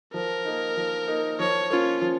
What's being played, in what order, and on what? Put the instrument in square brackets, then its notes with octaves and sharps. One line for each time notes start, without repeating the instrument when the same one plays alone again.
[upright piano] F3 [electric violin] A#4
[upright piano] A#3 D#4
F3
A#3 D#4
[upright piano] F3 [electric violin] C#5
[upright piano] A#3 C#4 [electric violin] F4
[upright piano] F3